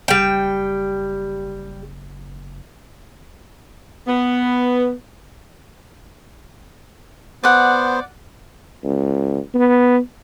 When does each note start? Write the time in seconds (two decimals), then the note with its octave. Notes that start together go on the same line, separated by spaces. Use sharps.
0.08 F#1 G3 G5
4.08 B3
7.44 B3 C5 D5 F#5
8.84 C#2
9.54 B3